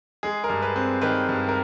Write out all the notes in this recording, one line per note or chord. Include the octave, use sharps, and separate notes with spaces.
G#3 G#4
A#4
G2
B4
C4
D#3 B4
G2
A#4